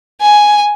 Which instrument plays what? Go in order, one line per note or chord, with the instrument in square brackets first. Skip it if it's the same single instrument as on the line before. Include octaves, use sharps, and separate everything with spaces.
[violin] G#5